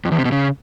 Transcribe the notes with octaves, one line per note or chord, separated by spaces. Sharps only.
F2
E2
C3
B2
C#3